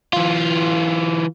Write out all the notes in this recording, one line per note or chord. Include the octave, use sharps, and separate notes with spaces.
E3 F4